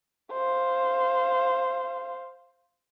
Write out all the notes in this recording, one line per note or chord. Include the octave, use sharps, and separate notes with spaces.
C5 F5